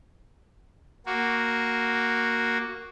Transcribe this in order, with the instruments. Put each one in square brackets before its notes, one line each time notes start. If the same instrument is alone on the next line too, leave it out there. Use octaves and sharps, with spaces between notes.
[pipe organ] A#3 F#4